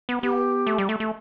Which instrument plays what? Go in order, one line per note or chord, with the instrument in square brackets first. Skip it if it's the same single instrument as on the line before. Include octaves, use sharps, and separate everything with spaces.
[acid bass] B3
[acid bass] B3 [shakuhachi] G4
[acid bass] A3
G3
A3
A3